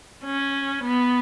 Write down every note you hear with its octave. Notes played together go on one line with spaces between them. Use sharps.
C#4
B3